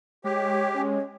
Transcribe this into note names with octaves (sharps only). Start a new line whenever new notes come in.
G#3 G4 C#5
C#4 C#5